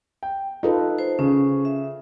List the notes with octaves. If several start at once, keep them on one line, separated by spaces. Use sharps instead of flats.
G5
D#4 F4 A4 B4
C5
C#3 C#4
E5